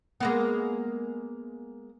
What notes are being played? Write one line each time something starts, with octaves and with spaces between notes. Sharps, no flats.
G#3 A#3 B3